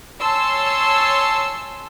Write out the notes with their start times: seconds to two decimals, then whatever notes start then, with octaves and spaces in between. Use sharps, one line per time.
0.21 C#5 G#5 A5 C6 E6